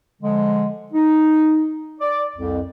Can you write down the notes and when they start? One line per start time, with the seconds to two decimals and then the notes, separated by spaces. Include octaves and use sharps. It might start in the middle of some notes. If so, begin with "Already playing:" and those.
0.22 D3 F3 G#3
0.93 D#4
2.01 D5
2.36 C2 F2